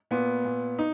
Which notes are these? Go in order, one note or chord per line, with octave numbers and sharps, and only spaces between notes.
A#2 B3
A#2
D#4